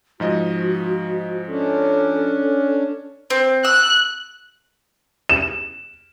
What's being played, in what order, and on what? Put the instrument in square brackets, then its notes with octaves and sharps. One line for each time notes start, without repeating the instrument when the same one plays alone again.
[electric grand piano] G#2 F3 D#5 [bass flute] F#4
[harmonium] C#4 D4 [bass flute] A4
[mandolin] C4
[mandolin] E6 [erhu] F#6
[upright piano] E7